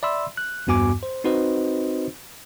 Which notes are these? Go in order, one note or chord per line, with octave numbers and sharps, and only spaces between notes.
D5 E5 B5 C6 E6
F#6
E2 G2 B3 F#4 G#5 D6
C5
C4 D#4 F#4 B4 C5 D#5